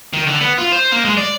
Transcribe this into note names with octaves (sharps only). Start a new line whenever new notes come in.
D#3
D3
B3
F4
C5
A#3
G#3
D5